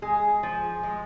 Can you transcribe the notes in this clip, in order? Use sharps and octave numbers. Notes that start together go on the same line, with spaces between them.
G#3 G#4
F3
G#3